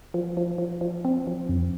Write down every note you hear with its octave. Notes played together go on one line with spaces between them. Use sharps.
F3
F3
F3
F3
C4
F3
F2